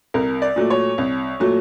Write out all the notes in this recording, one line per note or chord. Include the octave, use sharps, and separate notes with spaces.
C2 A#4
D5
A#2 F#3 A3
C#5
C2
A#2 F#3 A3